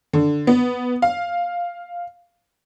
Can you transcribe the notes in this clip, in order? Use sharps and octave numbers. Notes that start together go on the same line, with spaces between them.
D3
B3
F5